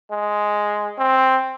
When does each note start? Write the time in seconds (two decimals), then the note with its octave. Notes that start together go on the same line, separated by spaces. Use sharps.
0.11 G#3
0.98 C4